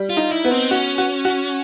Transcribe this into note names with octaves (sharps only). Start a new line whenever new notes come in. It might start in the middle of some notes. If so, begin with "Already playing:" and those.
Already playing: G3
F4
D#4
E4
B3
C4
C#4 F#4
F#4
F#4